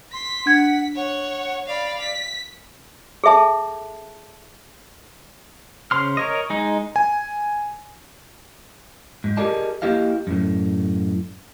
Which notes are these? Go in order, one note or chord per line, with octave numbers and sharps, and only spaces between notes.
C6 B6
D4 F#5 G#6
C#5 F#5
D5 F5 B5
B6
G#4 A4 E5 A5
C#3 C5 C6 F6
A#4 C#5 D#5
G#3 D#4
G#5
G#2
G4 G#4 A#4 D5 D#5 A5
A#3 E4 G4 D#5 F5
F#2 A2